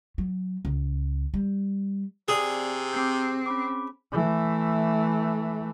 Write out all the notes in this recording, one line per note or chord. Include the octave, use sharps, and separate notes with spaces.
F#3
C#2
G3
C3 C4 G#4 D5
C4 D6 G6
C#4 B5 D6
E3 A3